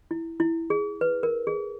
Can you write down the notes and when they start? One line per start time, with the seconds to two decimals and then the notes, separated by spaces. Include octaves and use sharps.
0.11 E4
0.40 E4
0.70 G#4
1.01 B4
1.23 A#4
1.47 G#4